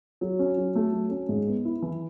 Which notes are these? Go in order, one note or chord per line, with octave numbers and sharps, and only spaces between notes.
F#3
C#4
F#3
A3
F#3
C#4
G#2
B3
E4
E3